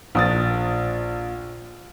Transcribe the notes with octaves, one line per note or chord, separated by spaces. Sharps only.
A#1 D#6 A6